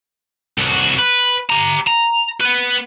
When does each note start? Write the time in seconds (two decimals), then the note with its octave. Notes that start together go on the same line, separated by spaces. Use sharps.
0.58 C2 F#4
0.99 B4
1.50 G4 A#5
1.87 A#5
2.41 B3 B4